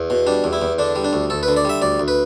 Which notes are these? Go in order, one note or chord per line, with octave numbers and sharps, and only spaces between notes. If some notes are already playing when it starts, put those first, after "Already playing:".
Already playing: E2
B2
G3 D4
E2
E4
E2
D3 D4
G3
D4
D2
D2 A4
B4
D3
D5
G3 E5
D2 D5
D2
B4